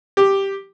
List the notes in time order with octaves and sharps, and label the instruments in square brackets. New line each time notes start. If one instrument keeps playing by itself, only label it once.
[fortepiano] G4